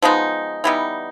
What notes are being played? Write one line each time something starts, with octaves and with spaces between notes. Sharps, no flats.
F3 G#3 B3 D#4
E3 G3 B3 D#4